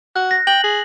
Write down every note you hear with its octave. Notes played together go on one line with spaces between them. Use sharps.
F#4 F#6
A#6
G5 F#7
G#4